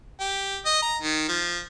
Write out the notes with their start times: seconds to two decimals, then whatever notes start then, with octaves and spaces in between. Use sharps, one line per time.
0.20 G4
0.66 D#5
0.82 A#5
1.01 D#3
1.28 F3